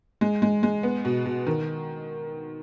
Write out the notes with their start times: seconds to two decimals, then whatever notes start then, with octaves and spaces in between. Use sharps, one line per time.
0.21 G#3
0.42 G#3
0.63 G#3
0.83 B3
1.05 B2
1.25 B2
1.47 D#3